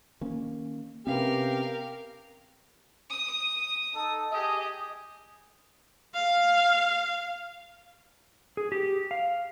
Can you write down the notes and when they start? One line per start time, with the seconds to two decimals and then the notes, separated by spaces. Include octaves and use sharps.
0.21 D#3 A#3 C#4
1.07 C3 B3 C#4 G4 A#4 B4 F5
3.10 D#6
3.93 D#4 A4
4.32 G4 G#4 D#5
6.15 F5
8.57 G#4
8.72 G4
9.11 F5